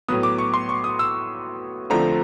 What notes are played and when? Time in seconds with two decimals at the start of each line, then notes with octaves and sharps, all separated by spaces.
0.08 A2 F#3 B3 D#6
0.23 D6
0.38 C#6
0.54 C6
0.69 C#6
0.84 D#6
0.99 E6
1.90 D3 F3 A3 C4 A#5